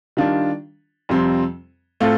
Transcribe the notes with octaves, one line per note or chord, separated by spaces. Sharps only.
D#3 G3 D4 F4
F2 C3 G3 C4
A2 A3 C4 F4 A4